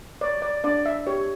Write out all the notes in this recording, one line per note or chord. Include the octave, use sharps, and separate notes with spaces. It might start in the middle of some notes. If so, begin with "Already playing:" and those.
C#5 D5
D5
D4 D5
E5
G4 C#5